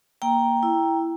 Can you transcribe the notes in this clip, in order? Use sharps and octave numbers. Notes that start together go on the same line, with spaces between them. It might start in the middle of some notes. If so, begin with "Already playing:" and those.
A#3 G5 A#5
E4